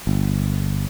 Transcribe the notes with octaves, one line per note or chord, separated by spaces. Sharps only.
G1